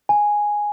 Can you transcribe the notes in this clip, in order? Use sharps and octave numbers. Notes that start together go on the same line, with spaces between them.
G#5